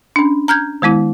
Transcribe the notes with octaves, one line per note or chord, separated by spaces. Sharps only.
C#4 D4
A#5 F6 G6 G#6
D#3 G#3 B3 E4